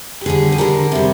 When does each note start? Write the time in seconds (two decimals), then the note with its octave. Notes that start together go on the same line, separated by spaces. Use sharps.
0.21 G4
0.26 D3 G3 G#4
0.52 G#4
0.58 D3 G3 A#4
0.92 C3 G3